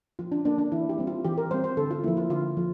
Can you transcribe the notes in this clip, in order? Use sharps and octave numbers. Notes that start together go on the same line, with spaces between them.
F3 F4
D4
A#3 D4
D4
E3 E4
G4
G3 C4
F4
E3 G4
A#4
G3 C4 C5
C5
D3 A4
F4
F3 A#3 E4
F4
D3 F4
F3